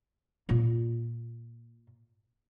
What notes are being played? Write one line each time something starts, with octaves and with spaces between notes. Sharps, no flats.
A#2 F4